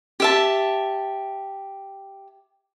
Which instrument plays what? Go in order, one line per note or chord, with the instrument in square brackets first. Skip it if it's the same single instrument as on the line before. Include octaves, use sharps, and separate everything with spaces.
[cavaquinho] G4 E5 A5